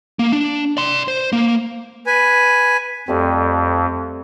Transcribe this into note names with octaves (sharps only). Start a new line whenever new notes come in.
A#3
D4
D5 C6
C5
A#3
B4 G#5
F2 G3 A3 C4